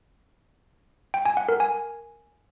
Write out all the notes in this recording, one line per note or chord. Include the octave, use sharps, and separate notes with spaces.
G5
G#5
F#5
A#4
G#5